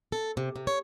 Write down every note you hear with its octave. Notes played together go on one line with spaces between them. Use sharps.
A4
C3
C3
C#5